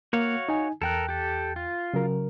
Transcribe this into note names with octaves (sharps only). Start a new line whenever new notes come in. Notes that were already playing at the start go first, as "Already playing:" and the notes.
A#3 F#4 C#5 F5
D#4 G#5
E2 A4 A#4 G5 F#6
G4 A4
F4
C#3 F#3 A#4